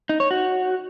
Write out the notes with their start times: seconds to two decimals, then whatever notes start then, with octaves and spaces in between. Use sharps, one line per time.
0.09 D#4
0.20 C#5
0.31 F#4